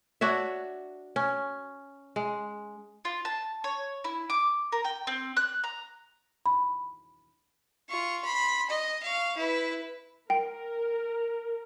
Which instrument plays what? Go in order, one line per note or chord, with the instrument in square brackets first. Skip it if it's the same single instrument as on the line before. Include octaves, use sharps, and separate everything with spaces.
[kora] D4 F#4 C#5 E5
C#4
G#3
[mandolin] F4
A5
C#5
E4
D6
A#4
G5
C4
F#6
A#5
[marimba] B5
[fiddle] F4 C#6
B5 C6
D#5
F5 C#6
E4 B4
[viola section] A#4 [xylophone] G5